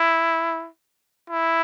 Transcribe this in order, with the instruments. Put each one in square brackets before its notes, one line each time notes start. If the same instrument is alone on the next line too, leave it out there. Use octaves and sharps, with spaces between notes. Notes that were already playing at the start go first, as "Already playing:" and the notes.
Already playing: [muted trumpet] E4
E4